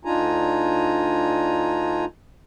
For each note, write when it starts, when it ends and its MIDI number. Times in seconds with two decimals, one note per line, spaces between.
0.05 2.05 38
0.05 2.05 62
0.05 2.05 63
0.05 2.05 65
0.05 2.05 80
0.05 2.05 82